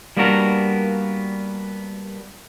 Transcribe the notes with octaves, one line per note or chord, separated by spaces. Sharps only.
G3 A#3 B3 D4 F#4 A#4